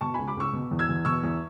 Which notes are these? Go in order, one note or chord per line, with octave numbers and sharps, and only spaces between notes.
B2 A5 C#6
C#2 G#5 B5
B5 D6
C#2 C#6 E6
B2
E2
E6 G#6
E2
B2 C#6 E6
E2